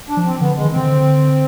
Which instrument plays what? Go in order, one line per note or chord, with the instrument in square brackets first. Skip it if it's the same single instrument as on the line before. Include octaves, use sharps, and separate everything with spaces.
[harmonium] D4
[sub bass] F3
[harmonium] C4
[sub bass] D3 [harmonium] B3
[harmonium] G#3
[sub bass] D#3
[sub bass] D3 [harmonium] C4